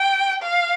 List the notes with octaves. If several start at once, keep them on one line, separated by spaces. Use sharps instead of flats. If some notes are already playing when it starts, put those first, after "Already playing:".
Already playing: G5
F5